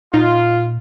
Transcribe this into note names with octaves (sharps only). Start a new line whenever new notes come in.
A#2 D#4 F4